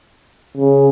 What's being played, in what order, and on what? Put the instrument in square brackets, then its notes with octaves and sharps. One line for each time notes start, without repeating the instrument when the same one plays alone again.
[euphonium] C#3